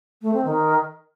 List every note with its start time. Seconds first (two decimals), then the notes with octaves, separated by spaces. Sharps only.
0.22 A3
0.33 C4
0.45 D#3